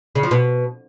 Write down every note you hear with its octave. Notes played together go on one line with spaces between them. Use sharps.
C#3
F3
B2